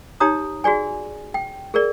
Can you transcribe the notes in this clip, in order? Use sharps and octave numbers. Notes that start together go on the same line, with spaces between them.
D#4 G4 C#5 A#5 D#6
F#4 G#4 D5 G#5
G5
G#4 A#4 D5